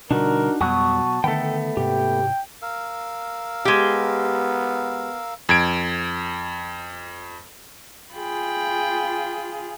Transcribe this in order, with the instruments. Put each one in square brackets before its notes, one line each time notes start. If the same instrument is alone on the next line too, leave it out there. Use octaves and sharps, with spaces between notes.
[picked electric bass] B2 D3 G3 [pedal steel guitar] D4 D#4 F#4 [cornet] A#4
[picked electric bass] F2 G3 B3 [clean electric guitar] B2 F#3 F#4 [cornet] A5 [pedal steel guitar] D#6
[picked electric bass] D3 D#3 [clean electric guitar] A3 B3 [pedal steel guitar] A4 G5
[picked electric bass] G#2 C3 [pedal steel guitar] G4 [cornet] G5
[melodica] A#4 F5 E6
[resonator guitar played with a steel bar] G#3 G4 [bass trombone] B3
[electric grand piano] F2 G#6 D7
[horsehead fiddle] F4 G#4 [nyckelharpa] G5 B5